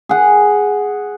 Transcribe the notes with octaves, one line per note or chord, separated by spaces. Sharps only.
G#4 F#5